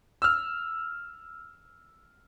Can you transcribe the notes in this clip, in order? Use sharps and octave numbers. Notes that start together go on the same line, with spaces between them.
E6 F6